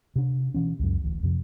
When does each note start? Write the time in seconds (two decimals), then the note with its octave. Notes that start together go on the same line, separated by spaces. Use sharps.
0.16 C3 D4
0.54 B2 E3 C#4
0.79 C#2 F#2
1.04 D1 A1
1.23 F2 C3